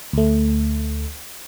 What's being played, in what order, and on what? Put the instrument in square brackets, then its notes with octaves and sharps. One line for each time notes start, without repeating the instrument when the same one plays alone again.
[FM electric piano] D2 A3